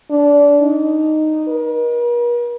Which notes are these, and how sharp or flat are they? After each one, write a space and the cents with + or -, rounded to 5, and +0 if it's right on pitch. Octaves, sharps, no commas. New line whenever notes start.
D4 -25
D#4 -5
A#4 +45